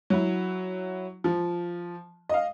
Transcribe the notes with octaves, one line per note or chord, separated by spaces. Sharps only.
F#3 E4
F3
D#5 F5